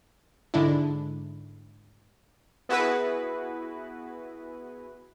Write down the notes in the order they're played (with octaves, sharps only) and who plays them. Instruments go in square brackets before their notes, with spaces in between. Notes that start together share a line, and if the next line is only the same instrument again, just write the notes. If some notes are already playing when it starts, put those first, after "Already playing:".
[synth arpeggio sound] G#2 D3 G#3 D4 E4
[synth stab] B3 E4 F#4 G#4 B4